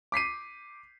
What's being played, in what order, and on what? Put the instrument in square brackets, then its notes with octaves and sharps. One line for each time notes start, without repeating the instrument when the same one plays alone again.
[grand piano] D6 B6 C7 D#7